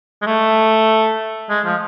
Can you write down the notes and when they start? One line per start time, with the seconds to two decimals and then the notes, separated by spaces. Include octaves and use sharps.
0.22 G#3
0.26 A3
1.49 G#3
1.65 F3